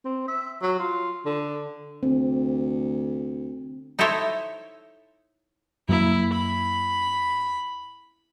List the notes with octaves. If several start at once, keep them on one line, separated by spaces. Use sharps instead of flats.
C4
E5
F#3
F4
D3
D2 C4
D#4 E4 A4 C5 C#5 E5
F#2 F#3 A#3 E4
B5